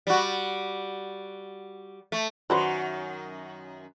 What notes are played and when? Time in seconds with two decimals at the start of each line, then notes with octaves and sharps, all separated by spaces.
0.07 G3 F#4
2.12 A3
2.50 F#2 D#3 F#4 B4 C5 D5